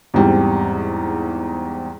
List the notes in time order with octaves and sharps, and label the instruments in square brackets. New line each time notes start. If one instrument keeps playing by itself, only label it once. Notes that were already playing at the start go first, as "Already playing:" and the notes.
[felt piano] E2 G#2 G3 C4